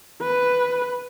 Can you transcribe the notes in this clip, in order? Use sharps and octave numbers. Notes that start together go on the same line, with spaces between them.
B4